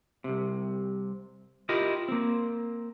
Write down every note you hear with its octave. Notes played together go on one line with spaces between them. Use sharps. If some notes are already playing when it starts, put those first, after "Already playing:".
C2 C3
E4 F4 G4 A#4 D#5
A#3 C4